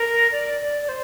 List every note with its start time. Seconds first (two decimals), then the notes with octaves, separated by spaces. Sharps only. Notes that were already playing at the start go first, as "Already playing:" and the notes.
Already playing: A#4
0.32 D5
0.61 D5
0.82 D5
0.89 C5